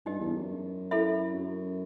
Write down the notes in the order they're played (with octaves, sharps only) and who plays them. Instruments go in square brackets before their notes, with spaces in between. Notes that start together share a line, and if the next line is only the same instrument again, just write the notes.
[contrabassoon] G2 [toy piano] D#4 G4 D#5
[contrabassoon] E2
F#2
[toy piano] E4 A4 E5 B5
[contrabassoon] F#2